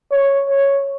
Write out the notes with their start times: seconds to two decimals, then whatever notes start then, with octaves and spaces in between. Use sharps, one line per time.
0.11 C#5
0.50 C#5